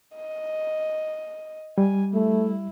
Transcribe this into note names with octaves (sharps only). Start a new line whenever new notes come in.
D#5
G3 G#5
A3 E4